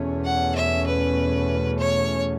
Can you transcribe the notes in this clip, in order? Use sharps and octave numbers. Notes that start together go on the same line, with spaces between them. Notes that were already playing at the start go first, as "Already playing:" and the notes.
Already playing: E2 B2 A3 C#4
F#5
E5
B4
C#5